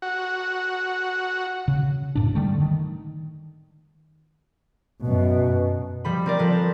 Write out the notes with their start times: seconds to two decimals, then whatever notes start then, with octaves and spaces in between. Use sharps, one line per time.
0.02 F#4
1.68 C#3
2.15 F#2 A2 D4
2.35 D3 G3 A3
2.60 D#3
5.02 F#2 B2
6.05 F3 G3 B5
6.26 C4 A#4 D5
6.39 F3 A4 B4
6.52 A#4